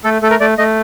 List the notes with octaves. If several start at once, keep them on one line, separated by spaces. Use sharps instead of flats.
A3 A4
A3 A4
A#4
A3 D5
A3 D#5